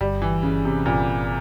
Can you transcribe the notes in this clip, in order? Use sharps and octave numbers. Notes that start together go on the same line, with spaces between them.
G1 G3
E3
G1 C#3
C3
G1 A#2